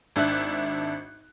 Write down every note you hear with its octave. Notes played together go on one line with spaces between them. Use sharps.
G#1 D4 E5 F#6